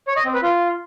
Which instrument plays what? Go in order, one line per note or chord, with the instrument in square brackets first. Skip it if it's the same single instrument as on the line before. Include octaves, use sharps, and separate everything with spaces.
[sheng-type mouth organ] C#5
D#5
C4
B4
F4